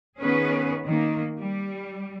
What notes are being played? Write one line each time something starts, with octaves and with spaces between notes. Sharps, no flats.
D#3 B3 C#4 G#4 B4
D#3 A#3
G3